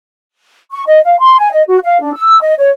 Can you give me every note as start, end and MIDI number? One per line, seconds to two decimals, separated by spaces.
0.71 0.83 85
0.87 1.00 75
1.04 1.17 77
1.20 1.38 84
1.39 1.51 80
1.52 1.63 75
1.68 1.78 66
1.84 2.00 77
2.01 2.14 62
2.14 2.39 88
2.42 2.54 75
2.58 2.69 73